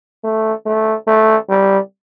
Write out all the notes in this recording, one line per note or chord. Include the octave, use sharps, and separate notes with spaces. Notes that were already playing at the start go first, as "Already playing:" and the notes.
A3
A3
A3
G3